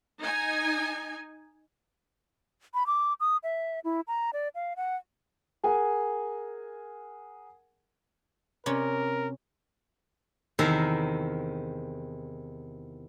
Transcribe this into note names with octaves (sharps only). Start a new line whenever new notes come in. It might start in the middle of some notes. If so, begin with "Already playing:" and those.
D#4 G#5
B5
D6
D#6
E5
E4
A#5
D5
F5
F#5
G#4 A#4 F#5 G#5
C3 C#4 A#4
E2 C3 D#3 A#4 E5 A#5